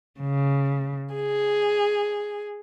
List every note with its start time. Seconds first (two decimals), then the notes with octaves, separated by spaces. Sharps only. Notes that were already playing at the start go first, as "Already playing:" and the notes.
0.19 C#3
1.14 G#4